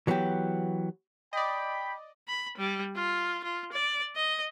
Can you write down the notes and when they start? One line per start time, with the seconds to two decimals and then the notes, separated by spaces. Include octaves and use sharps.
0.07 E3 F#3 B3 F#4 G4
1.33 D5 D#5 G5 B5
2.28 B5
2.57 G3
2.96 F4
3.44 F4
3.73 D5
4.16 D#5